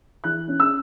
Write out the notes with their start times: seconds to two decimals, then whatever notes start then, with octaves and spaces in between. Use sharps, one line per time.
0.24 E3 F#6
0.48 C#4
0.60 E6